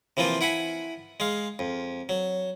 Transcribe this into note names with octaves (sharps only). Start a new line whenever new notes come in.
C3 E3 F3 A#3 F4
E4 F#5 G#5 B5
G#3 F5
F2
F#3